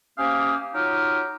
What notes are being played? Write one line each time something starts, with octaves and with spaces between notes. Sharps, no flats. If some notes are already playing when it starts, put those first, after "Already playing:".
C3 A#3 C#4 G4 F5 D#6
F#3 D#4 F4 G4 D#6 F6